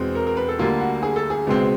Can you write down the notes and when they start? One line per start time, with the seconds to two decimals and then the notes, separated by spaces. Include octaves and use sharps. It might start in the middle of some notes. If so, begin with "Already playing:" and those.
Already playing: E2 B2 G#3 C4
0.15 A#4
0.27 A#4
0.37 B4
0.48 A4
0.59 D2 D3 G3 A#3 F4
0.81 F#4
1.03 G#4
1.16 A4
1.30 G#4
1.47 C#2 B2 G#3 C4